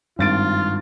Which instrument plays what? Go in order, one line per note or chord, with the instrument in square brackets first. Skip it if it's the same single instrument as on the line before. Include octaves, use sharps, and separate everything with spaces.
[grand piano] G#1 A6 D7 [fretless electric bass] G2 [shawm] F4